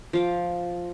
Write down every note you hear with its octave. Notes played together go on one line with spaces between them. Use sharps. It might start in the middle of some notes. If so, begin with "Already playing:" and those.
F3 F5 D6